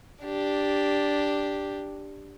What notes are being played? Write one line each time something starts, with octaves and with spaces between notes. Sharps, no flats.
D4 G4